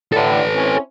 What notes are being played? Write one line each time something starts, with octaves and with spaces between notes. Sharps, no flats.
A2 D3 A4 B4
C4 C#4 E4